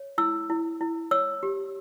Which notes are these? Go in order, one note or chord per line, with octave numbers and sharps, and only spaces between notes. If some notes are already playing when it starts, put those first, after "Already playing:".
Already playing: C#5
E4 E6
E4
E4
C#5 E6
G4